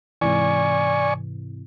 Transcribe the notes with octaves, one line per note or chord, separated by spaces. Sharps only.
G#2 C3 E3 D5 G#5 C#6